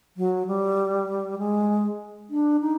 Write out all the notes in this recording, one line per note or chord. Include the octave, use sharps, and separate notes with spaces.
F#3
G3
G#3
D4
D#4